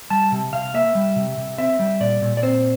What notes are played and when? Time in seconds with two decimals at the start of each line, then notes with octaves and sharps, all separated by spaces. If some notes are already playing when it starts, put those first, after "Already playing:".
0.10 G3 A5
0.32 C3
0.53 C3 F5
0.74 A#3 E5
0.95 G3
1.16 C3
1.37 C3
1.58 C4 E5
1.79 G3
2.00 A#2 D5
2.22 A#2
2.37 D5
2.43 C4 C5